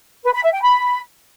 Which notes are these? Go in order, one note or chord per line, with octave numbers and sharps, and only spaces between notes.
B4
B5
E5
G5
B5